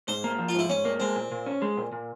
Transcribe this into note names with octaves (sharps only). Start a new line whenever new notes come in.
G#2 C5
A#3
F3
F4
G#2 E4
G#2 C#4
A#3
G#3 C4
A#2
A#2
C#4
G#3
A#2
A#2